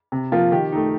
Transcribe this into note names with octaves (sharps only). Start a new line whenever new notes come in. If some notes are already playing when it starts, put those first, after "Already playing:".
C3
F3 A#3 F4
D#3 G4
A3 D#4